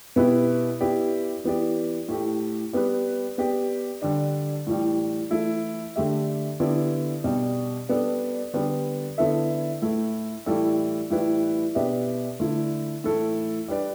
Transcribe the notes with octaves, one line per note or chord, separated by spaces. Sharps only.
B2 B3 E4 G4 B4
B3 E4 G4 D5
E3 B3 G4 D5
A2 A3 G4
G3 B3 G4 B4
B3 G4 D5
D3 G3 D4
A2 E3 G3
E3 A3 E4
D3 A3 G4 E5
D3 B3 E4 G4 D5
B2 G3 D4
G3 B3 D4 A4 D5
D3 G3 B3
D3 B3 E4 A4 E5
A2 A3 E4
A2 E3 G3 E4 A4
A2 E3 G3 E4 B4
B2 B3 D4 G4 E5
D3 A3 E4
A2 E3 A3 E4 A4
G3 D4 B4 D5